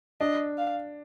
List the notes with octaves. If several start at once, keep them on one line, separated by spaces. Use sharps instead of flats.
D4 D#5
F5